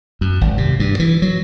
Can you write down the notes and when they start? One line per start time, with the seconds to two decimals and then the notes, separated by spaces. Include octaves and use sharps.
0.21 F#2
0.41 G#1
0.58 C3
0.79 G2
0.99 E3
1.22 F#3